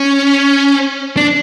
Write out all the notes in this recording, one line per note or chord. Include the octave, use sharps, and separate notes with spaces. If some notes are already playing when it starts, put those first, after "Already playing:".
Already playing: C#4
D4